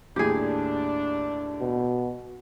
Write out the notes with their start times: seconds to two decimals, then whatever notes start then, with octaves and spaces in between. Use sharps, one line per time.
0.16 D#2 A2 D4 G4 G#4
1.61 B2